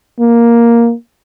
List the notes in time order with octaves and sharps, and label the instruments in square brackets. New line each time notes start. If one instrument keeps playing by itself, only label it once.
[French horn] A#3